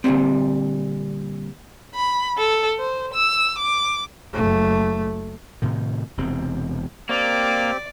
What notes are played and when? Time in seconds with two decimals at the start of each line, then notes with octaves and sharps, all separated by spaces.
0.04 A#2 D3 D#3 F#3 G3 C4
1.95 B5
2.38 A4
2.79 C5
3.14 E6
3.59 D6
4.33 F#1 A3
5.62 A2 C3 D#3
6.17 E1 E2 C3 C4
7.09 A#3 C4 G4 D5